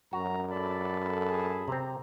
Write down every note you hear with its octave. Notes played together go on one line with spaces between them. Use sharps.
F#2 F#4 A#5
A4 D5 A5 B5
G#4
C3 C4 A#5